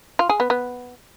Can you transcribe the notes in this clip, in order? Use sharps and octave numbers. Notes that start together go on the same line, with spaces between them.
F4
G#4
B3
B3